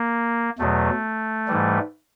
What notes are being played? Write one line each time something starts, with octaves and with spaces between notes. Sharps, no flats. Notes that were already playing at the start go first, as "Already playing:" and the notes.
Already playing: A#3
E2 B2 F#3 A3
G#2 E3 G3